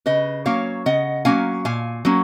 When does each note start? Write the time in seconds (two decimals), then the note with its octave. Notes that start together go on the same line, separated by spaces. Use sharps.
0.06 C#3 B4 D#5
0.46 F#3 A#3 C#4 C#5 F5
0.86 C#3 D#5 F#5
1.25 F#3 A#3 C#4 F5 G#5
1.65 A#2 F5 G#5
2.05 F#3 A#3 C#4